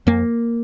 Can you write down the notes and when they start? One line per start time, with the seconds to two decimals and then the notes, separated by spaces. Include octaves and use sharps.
0.07 F2 A#3